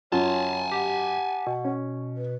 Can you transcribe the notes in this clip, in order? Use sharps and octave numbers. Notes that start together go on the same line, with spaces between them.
F#2 F4 C#5 G#5 A5
G4 F#5
B2
C#4
B4